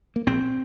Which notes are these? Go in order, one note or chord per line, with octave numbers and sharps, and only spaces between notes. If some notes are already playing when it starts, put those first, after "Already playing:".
A#3
A#1 C4